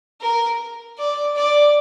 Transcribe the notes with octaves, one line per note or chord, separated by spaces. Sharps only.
A#4
D5
D5